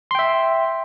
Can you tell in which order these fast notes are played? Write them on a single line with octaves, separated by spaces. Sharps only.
C6 G5 E5